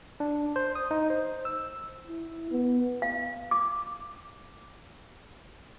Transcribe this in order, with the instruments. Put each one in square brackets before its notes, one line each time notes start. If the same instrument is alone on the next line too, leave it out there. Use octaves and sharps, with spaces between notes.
[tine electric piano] D4
C5
D#6
D#4
C5
E6
[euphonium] E4
B3
[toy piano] F5
D6